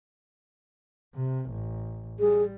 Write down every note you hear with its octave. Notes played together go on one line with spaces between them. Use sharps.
C3
A1
G3 G#4